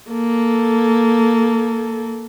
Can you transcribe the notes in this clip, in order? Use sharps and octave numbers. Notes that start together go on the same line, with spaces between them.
A#3 A4